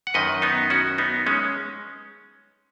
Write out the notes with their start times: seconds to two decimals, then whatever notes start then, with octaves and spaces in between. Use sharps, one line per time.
0.07 F#5
0.14 F#2 D#3 B4 D#5
0.42 B3 D#4
0.70 C#4 F#4
0.98 B3 D#4
1.26 G#3 C#4